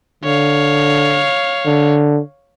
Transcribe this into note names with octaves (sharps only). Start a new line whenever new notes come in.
D3 C#5 F5
D3